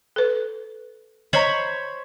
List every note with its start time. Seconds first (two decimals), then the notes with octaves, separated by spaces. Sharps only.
0.16 A4 B4
1.33 C5 C#5 D#5 A#5 B5